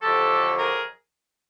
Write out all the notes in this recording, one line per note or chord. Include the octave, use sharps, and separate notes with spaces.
F2 D3 F#3 G4 A4
G#4 A#4